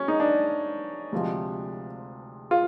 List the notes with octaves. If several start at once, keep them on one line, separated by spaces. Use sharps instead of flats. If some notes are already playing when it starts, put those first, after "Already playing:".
Already playing: F#3 C#4
D#4
D4
D2 C3 F3 G#3
F4